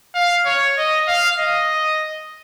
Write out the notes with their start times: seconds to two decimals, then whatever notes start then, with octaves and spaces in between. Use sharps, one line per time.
0.15 F5
0.46 C#5
0.78 D#5
1.08 F5
1.39 D#5